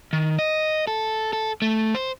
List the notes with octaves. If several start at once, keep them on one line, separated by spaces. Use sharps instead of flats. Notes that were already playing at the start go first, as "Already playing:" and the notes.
D#3
D#5
A4
A4
A3
C5